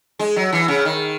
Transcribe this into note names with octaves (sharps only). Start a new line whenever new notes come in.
G#3
F#3
E3
C#3
D#3